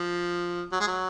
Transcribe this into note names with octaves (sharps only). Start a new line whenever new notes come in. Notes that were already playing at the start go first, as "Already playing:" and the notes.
Already playing: F3
F#3
G#3
F#3